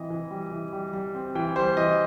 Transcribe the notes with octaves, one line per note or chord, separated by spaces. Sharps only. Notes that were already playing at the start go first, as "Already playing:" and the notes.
Already playing: E3 C4 D#5
E3
G3
E3
G3
G3
C4
E3 G5
G3 C5
E3 D#5